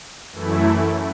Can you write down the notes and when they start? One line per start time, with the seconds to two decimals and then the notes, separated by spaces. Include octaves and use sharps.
0.32 F#2 E3 A3 E4